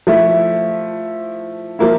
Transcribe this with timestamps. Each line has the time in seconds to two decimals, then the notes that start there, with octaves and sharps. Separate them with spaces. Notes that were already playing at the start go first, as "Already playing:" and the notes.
0.07 F3 A3 E4
1.79 F3 A#3 E4